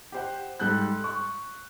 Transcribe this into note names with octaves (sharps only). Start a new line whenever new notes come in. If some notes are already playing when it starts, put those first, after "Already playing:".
G4 C5 F#5
G#2 G3 A4 F#6 G6
C#6